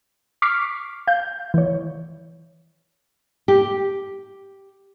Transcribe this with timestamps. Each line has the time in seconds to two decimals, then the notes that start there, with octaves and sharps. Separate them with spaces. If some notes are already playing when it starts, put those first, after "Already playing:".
0.42 C#6 D6 F6 B6 C7
1.07 F5 G6
1.54 E3 C#5
3.48 G4